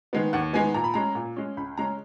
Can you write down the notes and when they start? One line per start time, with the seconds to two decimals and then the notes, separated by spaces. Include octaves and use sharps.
0.13 D#3 G#3 B3
0.33 D#2 F#5
0.53 D#3 G#3 B3 G#5
0.74 A#2 A#5
0.84 B5
0.94 G#3 C#4 A#5
1.15 A#2
1.36 G#3 C#4
1.57 C#2 B5
1.77 C#3 G#3 C#4 A#5